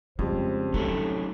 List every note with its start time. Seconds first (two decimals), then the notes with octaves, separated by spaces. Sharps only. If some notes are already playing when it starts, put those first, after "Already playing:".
0.19 F2 C#3 G3 G#3 C5
0.74 A2 C3 F#3 A3 C#4 D#4 A4